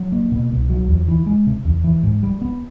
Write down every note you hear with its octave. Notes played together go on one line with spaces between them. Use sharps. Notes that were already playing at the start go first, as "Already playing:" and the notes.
Already playing: F#3
A#3
B2
C2
F#3
E2
E3
G#3
C3
E2
E3
G#2
G3
B3